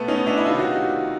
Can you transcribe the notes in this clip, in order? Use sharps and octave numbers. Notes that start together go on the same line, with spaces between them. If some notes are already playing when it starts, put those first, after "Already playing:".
Already playing: B2 A3 B3
C#4 D#4
D4 E4
E4
C3 D#3 D#4 F4
F#4